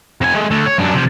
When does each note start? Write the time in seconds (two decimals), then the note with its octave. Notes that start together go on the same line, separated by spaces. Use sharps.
0.21 F2 G#5
0.35 G#3 A3
0.51 D3 A3
0.66 C#5
0.78 F#2 D4
0.94 C3 F3